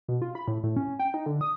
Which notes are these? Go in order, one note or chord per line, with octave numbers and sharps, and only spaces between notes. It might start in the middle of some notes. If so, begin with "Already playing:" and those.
B2
F4
B5
A2
A2
C#4
G5
D#4
D3
D#6